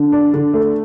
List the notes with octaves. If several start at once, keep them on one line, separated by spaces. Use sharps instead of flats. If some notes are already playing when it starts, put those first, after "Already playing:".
Already playing: D3
D4
D3
A3